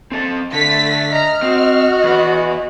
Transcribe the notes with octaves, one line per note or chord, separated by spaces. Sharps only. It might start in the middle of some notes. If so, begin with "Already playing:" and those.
C4 A4 A5
D3 A3 A6 B6
D#5 A#5 F6
C4 F#4
E2 B4